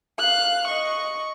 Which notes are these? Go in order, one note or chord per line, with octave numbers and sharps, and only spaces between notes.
F5 F#6
D#5 C#6